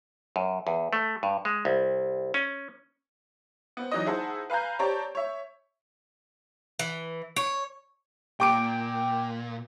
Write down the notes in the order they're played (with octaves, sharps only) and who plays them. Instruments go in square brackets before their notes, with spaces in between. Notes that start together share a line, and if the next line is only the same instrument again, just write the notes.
[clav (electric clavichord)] F#2
E2
A3
G2
G#3
C2
C#4
[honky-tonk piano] B3 C4
E3 F#3 D#4 D5 D#5
D#4 E4 G#4 C5 F#5 A5
B4 F5 G#5 A#5 G6
C4 G4 C#5 D5 A5 A#5
C#5 E5
[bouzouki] E3
C#5
[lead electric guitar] A#2 [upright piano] G5 D6 D7